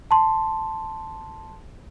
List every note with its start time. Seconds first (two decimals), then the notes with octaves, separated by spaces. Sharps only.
0.11 A5 C6